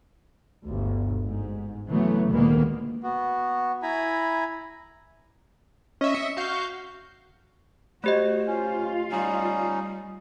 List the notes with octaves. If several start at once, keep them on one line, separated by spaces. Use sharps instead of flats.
G1 D2
G#2
C#3 E3 F#3 A3 B3
D2 A#2 D#3 G#3 A#3 B3
B3 F#4
E4 G#5 A#5 B5
C#4 D#5 E5
C#7
F#4 F5 C#6 G6
A3 F#4 G4 C5 D#5
C#4 F4 F5
G3 C#4 D#4